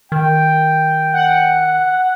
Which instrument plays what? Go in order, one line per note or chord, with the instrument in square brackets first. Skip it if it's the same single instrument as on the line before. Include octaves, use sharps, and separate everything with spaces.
[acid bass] D#3 [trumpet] G5
[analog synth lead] F#5